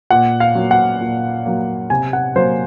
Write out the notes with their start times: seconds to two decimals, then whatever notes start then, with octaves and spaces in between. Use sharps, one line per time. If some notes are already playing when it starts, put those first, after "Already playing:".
0.10 A#2 F#5
0.40 F5
0.55 F#3 A#3
0.71 F#5
1.00 A#2
1.45 F#3 A#3
1.90 C3 G#5
2.13 F#5
2.36 F#3 A#3 C5